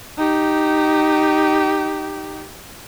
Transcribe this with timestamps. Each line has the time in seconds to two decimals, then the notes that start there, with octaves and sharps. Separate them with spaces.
0.18 D#4 G4